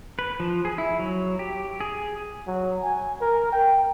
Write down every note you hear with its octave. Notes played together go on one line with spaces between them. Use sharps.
B4
F3
G#4
E4
F#3
G4
G#4
F#3
G#5
A#4
G5